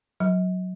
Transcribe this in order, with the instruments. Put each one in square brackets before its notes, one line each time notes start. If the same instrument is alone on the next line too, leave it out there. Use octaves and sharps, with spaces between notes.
[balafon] F#3